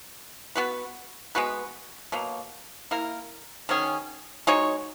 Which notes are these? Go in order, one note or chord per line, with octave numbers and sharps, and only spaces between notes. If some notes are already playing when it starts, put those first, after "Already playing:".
B3 F#4 B4
G#3 B3 F#4 B4
B2 F#3 A#3
A#3 E4 A#4
D#3 F#3 C#4 G#4
G#3 D#4 F#4 C#5